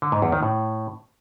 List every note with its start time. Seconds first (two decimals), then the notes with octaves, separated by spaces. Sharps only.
0.02 D3
0.12 G#2
0.22 E2
0.32 D#3
0.43 A2